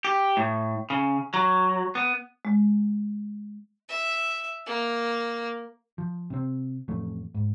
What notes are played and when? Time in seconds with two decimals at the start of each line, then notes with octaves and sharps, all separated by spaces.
0.05 G4
0.37 A2
0.90 C#3
1.34 F#3
1.95 B3
2.45 G#3
3.89 E5
4.67 A#3
5.98 F3
6.30 C3 C4
6.88 A1 F2 A3
7.35 G#2